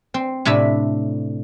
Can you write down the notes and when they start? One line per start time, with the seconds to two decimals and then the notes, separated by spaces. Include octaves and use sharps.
0.14 C4
0.45 A2 C3 D4 E5 B5